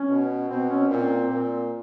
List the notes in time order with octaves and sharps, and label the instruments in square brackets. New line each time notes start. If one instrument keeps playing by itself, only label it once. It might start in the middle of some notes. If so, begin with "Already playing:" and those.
Already playing: [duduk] C#4
[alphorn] B2
[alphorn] B2 [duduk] C4
[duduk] C#4
[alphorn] A#2 [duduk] C4
[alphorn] A#2